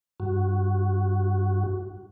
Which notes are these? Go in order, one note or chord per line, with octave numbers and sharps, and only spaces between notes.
G2 F#4